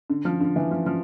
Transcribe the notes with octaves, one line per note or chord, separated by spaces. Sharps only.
D3
F3
D3
E3
F3
F3